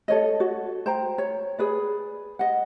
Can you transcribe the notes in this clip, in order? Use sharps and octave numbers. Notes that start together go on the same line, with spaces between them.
A4 C#5 D#5
F#4
C5 G5 A#5
C#5
G#4 B4 D5
D#5 F#5